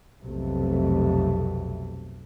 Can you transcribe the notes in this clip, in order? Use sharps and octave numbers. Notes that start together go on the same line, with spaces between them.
B1 F2 C3 A3